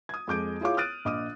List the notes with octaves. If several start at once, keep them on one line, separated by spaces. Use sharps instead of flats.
D#6 G#6
F2 G#3 D6 G6 D7
E4 F4 G#4 C#5 F5 D6
D#6 F6 F#6 A6 D7 D#7
A#1 D#5 D6 D#6 D#7